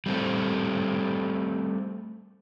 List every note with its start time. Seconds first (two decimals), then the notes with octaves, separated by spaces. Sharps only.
0.06 G3 A3 C4 A4